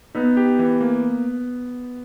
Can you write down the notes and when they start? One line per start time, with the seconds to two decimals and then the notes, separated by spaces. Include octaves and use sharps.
0.15 B3 D#4
0.37 G4
0.59 E3
0.81 A#3